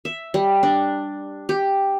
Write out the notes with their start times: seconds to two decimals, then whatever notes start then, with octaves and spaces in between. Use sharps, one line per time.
0.05 E5
0.34 G3
0.63 D4
1.49 G4